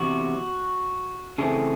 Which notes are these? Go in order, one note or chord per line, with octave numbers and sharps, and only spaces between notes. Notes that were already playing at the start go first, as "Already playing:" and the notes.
Already playing: E2 C3 F#4
C#3 E3 A3 C4 G#4